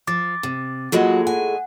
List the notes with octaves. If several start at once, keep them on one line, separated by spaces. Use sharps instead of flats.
F3 D6 A6
C3
A2 F#3 G#3 A#3 F4 F#4
F#5 G#5